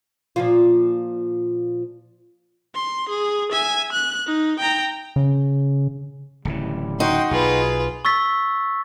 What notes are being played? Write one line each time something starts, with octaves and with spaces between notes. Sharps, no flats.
A#2 F3 F4
C6
G#4
E5 G#5
F#6
D#4
G5 A#5
C#3
D1 C#3 E3 G3
D#4 F#4 G5 C6
B1 F4 G#4 B4
C#6 E6 A6 B6